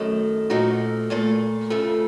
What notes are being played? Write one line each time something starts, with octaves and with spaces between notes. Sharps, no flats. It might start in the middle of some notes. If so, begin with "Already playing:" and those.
Already playing: F#2 D#3 A3
A#2 F3 A3 D#4 F#4
A#2 A3 F4 A4
F2 C#3 F3 A3